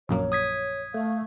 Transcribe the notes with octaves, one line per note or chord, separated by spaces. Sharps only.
A#1 F#2 A#3 C#5
D#6 G#6 B6
A3 F5